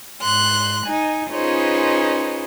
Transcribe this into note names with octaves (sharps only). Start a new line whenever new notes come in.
G#2 C6 F#6
D#4 G#5
C#4 D#4 F4 G#4 B4 C5